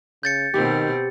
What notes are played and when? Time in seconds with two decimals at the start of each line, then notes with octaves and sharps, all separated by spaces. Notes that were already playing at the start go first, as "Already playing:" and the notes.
0.23 C#3 G6 A6 C#7
0.54 B2 D#3 C4 G4